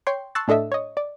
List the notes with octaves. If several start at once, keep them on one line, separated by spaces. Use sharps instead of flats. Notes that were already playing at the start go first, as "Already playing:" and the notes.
C#5 G5 C6
A5 C6 C#6 E6 F#6 A6
A2 D4 A4 D#5 E5
C#5 D#5
D5